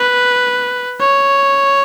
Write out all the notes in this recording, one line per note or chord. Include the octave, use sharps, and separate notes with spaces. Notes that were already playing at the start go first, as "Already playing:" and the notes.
Already playing: B4
C#5